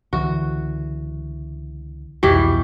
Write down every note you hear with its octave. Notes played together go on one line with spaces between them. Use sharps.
C#2 D3 E3 F#4
C2 F2 B2 E3 G4